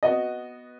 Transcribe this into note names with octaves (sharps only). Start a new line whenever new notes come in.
B3 F#4 D#5